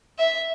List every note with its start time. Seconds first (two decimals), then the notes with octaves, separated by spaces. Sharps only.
0.19 E5